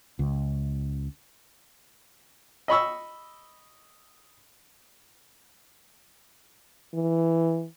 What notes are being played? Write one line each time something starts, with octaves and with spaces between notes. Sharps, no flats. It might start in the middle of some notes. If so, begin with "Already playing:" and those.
C#2
D#5 B5 C#6 E6
E3